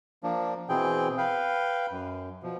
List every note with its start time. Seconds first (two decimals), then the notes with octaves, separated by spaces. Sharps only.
0.23 F3 A#3 D4
0.69 B2 E3 C4 G#4 G5
1.18 B4 F5 G5
1.91 F#2
2.43 B2 F3